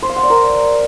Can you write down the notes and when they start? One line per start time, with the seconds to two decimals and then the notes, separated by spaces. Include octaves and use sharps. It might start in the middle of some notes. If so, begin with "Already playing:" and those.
0.02 C5
0.09 F5
0.16 F#5
0.23 D5
0.30 A#4